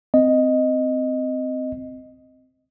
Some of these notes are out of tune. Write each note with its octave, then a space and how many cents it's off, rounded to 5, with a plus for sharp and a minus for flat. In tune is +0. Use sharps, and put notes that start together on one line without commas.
C4 -15 D#5 +0